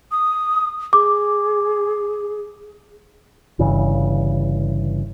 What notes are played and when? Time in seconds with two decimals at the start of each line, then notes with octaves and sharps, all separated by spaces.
0.12 D#6
0.93 G#4 D6
3.59 G1 G2 C#3 E3